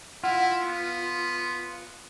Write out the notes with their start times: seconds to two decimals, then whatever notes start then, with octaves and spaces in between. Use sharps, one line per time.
0.24 E4 F4 F#5
0.63 B3